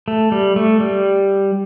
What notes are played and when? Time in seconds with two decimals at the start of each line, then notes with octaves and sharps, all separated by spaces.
0.08 A3
0.32 G3
0.56 A3
0.80 G3